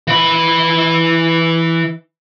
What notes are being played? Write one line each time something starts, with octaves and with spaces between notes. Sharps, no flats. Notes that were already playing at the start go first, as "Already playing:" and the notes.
E3 B5